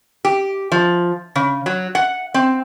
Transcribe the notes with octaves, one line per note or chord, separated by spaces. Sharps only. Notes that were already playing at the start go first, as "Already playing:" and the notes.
G4
F3
C#3
F#3
F#5
C4